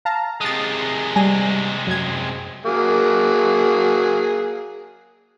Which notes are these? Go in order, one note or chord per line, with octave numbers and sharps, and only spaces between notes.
F5 A5 A#5
C3 G#3 D#6 A6
G3 G#5 A#6
F#2 G#6
F#3 A#3 G#4